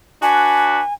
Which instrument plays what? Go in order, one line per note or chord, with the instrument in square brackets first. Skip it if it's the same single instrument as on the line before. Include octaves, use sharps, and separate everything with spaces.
[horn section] D4 F#4 B4 [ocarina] G#5